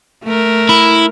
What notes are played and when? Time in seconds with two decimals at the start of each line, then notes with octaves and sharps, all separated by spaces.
0.24 A3 A#4
0.69 E4